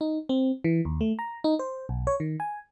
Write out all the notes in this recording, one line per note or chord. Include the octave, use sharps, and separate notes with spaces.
D#4
C4
E3
D#2
A3
A#5
D#4
C5
B1
C#5
D#3
G#5